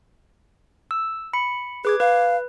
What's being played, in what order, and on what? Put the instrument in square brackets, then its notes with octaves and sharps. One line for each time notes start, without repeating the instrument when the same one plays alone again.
[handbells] E6
B5 C#7
[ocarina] G#4 [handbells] B4 D6 G#6
[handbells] B4 [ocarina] F5